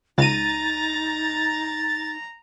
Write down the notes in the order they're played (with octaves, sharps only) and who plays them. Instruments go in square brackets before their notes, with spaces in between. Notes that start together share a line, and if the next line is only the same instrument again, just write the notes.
[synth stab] C#2 D#7 [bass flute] D#4 [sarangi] A#5 [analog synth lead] A6